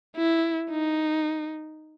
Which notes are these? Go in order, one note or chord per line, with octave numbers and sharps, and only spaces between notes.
E4
D#4